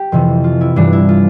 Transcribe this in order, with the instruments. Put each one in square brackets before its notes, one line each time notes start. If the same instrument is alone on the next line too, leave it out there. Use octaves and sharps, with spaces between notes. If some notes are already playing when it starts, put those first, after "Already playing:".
Already playing: [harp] G4
F2 C3 E3
F4
E4
G2 E3 D4
E4
F4